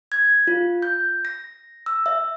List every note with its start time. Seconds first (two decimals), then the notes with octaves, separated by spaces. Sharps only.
0.12 G#6
0.47 F4
0.82 G6
1.25 A#6
1.86 E6
2.06 E5